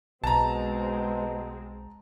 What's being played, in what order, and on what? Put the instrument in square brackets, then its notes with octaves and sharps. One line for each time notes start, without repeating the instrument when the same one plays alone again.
[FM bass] B1 [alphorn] B2 [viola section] G#3 C4 [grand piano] A5 A#5